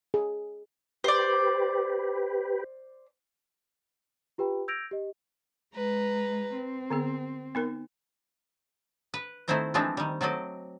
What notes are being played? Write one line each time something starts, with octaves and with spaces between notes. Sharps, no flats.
G#4
G4 B4 C5 D5
F4 G4 B4 G5 B5
E6 G6 G#6 A#6 D7 F7
G4 D#5
G#3 B4 A#5
C4
D3 B3 G#4
B3 D#4 A#4
B4
D#3 A3 C4 E4 C5 A#5
E3 F3 G#3 A3 C4 D4
D#3 G3
F#3 A3 C4 D5 D#5